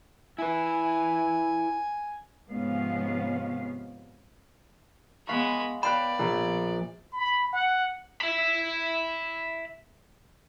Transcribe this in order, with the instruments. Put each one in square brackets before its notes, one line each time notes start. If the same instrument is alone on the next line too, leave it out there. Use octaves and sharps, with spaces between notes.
[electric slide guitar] E4 B4 [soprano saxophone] G#5
[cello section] G#2 C3 F3 B3 C#4 F5
[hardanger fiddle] G#3 B5 [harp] B3 F5 C#6
[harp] B4 F5 G5 [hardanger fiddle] D5 [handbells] B5
[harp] A#1
[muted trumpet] B5
F#5
[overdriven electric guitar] E5 B5